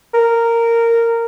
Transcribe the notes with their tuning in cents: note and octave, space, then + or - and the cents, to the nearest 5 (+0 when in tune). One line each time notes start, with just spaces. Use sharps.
A#4 -10